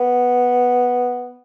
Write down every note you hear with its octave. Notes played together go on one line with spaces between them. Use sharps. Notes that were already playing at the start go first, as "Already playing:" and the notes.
Already playing: B3